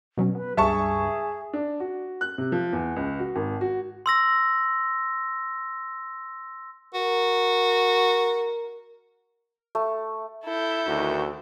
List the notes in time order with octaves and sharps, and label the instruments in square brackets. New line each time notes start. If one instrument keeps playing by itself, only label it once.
[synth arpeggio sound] B2 F#3 C#4
[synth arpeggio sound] B3 [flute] B4
[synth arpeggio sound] C#2 G2 [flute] G#4 [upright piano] E5 A5 C#6
[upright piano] D4
F#4
F#6
C3
F3
E2
C#2
F#4
G#1
F#4
[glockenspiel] C6 E6 A#6
[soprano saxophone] F#4 [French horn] A#4
[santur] A3
[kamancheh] E4 [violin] A4 G6
[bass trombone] D2 [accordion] D#3 F#4